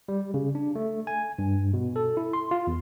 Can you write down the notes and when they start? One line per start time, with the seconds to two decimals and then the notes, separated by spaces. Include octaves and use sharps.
0.08 G3
0.34 C#3
0.55 D4
0.75 A3
1.07 G#5
1.39 G2
1.74 B2
1.96 A4
2.17 E4
2.33 C6
2.51 F4
2.67 E2